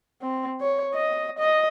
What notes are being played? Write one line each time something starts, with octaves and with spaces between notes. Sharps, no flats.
C4
C#5
D#5
D#5